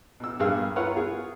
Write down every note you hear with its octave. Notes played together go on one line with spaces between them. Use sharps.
B2 E6
G2 A#3 G#4 F5 E6
E4 F4 A#4 B4 C#5 F#5
F4 G#4